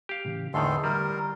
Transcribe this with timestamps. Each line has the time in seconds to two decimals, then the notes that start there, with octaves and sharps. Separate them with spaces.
0.09 G4 F5
0.25 A2 C#3 E3
0.54 E2 A2 D3 D#3 G#3 A4 C6
0.84 G3 A#4